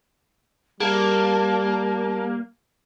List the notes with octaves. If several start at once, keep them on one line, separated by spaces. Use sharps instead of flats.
G3 A#3 G#4 A5